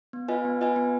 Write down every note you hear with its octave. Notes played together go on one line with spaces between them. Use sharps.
B3
F4 B4 D#5 G#5
B3
F4 B4 D#5 G#5
B3